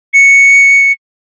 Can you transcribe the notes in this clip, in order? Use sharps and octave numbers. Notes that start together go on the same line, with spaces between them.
C#7